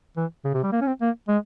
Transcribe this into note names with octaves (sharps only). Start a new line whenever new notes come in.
E3
C#3
C3
G3
A#3
C#4
C4
A#3
G#3